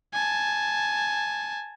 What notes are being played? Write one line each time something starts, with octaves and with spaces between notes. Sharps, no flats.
G#5 A5